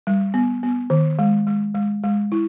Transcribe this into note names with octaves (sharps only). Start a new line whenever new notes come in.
G3
B3
B3
D#3
G#3
G#3
G#3
G#3
E4